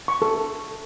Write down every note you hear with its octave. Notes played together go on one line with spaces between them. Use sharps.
C#6
A4